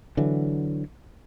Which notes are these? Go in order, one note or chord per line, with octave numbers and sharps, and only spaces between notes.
D3 E3 F#3